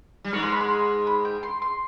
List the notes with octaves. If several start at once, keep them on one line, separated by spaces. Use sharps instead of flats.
G3
G#2 G#3 C#6
C6
B5
C6
B5
G5
C6
C6